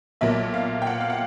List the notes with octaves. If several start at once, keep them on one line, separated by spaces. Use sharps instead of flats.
B1 A#2 F#3 A#3 E5
F5
G5
F#5
F5
F#5